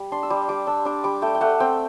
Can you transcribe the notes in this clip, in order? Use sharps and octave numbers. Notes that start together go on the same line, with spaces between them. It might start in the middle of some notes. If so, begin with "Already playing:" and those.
Already playing: G3
D4 C6
E6
G3 D6
G3 D6
D4 E6
D4 D6
G3 D6
A3 G5
G5
A3 F#5
C4 G5